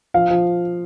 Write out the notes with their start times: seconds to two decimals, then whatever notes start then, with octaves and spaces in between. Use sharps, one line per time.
0.14 F3 F5
0.30 F3